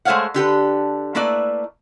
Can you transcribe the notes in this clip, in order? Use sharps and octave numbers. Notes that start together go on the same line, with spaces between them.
G#3 A3 C5 C#5 F5 F#5
D3 G4 A4 B4
A3 A#3 E4 B4 D5